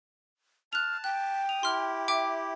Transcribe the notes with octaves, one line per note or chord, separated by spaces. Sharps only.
A5 F6 F#6 F7
G5 F#6
D#6 F7
E4 G4 C6 F6
E5 G5 D6